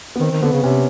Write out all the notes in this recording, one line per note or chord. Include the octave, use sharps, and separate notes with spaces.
B3
D#3 C4
D#3
D3 B3
C#3
C3 C#4